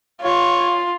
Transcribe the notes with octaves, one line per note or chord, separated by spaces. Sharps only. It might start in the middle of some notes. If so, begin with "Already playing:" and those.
F4 C#5